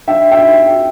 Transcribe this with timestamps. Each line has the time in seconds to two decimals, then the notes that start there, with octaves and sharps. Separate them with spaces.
0.08 D4 E5 G5
0.31 E5 G5